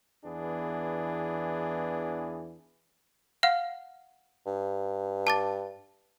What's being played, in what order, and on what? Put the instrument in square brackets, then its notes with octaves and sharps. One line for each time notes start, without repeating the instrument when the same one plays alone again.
[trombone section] E2 E3 B3 D4 G#4
[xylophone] F5 F#5 F6
[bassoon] G2
[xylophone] A5 D6 A6